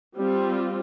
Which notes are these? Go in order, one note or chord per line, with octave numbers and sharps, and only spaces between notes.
G3 C4 F4